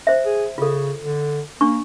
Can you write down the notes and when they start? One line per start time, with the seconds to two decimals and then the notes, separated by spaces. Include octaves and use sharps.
0.07 C5 E5
0.25 G#4
0.58 C#3 F4 A4
1.02 D3
1.61 A#3 D4 C#6